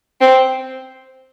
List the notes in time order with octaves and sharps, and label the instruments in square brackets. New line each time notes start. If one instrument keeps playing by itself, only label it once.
[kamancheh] C4